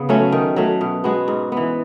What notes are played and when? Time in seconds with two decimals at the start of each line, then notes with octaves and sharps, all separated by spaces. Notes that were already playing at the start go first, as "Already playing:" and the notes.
Already playing: C#3 B3
0.09 F#3 A3 C#4
0.32 D#3
0.56 F#3 A3
0.81 B2
1.04 G#3 B3 F#4
1.28 G#2
1.52 E3 B3